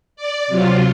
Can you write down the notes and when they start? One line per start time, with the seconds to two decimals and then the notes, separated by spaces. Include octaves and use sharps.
0.16 D5
0.48 C3 F#3 F4